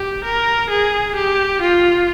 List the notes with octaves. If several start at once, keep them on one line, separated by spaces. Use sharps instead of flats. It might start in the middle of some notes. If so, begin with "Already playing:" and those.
Already playing: G4
A#4
G#4
G4
F4